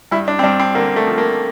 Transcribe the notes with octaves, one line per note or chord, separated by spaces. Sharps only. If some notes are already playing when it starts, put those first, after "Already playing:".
G2 E4
D4
C4
G2 D4
C4
D3 A#3
A3
F3
A#3